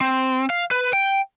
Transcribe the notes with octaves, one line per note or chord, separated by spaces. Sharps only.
C4
F5
B4
G5